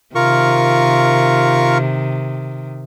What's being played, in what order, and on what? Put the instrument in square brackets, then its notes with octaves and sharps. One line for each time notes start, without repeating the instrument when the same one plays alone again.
[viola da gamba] C3 D#3 [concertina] F4 A#4 C#6